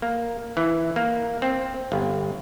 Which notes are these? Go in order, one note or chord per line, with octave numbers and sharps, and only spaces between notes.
A#3
E3
A#3
C4
G1